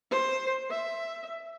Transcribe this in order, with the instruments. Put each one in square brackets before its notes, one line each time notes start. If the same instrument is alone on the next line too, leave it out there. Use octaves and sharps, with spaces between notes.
[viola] C5
E5